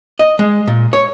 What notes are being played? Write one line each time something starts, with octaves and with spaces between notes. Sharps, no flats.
D#5
G#3
A#2
C#5